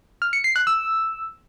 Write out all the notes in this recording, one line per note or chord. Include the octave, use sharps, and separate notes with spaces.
F6
C#7
C7
F#6
E6